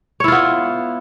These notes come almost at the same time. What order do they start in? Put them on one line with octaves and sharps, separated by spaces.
C#5 E4 F4 B3